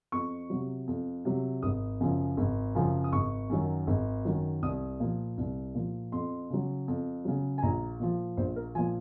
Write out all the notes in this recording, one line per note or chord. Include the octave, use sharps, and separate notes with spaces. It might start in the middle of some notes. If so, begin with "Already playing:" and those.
F2 C#6
C3 F#3
F2
C3 F#3
G#1 D#6
F#2 C#3 F3
G#1
F#2 C#3 F3
D#6
G#1 C#6
F#2 D#3 F#3
G#1
F#2 D#3 F#3
C2 D#6
A#2 F3
C2
A#2 F3
F2 C6
C#3 F#3
F2
C#3 F#3
G#5
A#1 A#5
A#2 F3
A#1 C5
A#4
A#2 F3 G#5